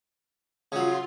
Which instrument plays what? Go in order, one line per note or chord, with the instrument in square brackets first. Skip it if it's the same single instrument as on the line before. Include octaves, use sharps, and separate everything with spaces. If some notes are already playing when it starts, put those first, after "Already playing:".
[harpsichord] C#3 F#3 [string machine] F4 C6